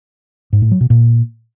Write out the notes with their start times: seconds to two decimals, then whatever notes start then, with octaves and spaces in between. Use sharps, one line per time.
0.53 G#2
0.62 A2
0.71 F#3
0.81 B2
0.90 A#2